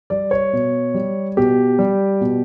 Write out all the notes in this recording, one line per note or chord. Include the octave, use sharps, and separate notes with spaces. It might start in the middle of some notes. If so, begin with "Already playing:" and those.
G3 D5
C#5
B2
G3
B2 G4
G3
B2